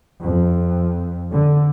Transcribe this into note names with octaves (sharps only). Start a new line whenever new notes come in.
F2
D3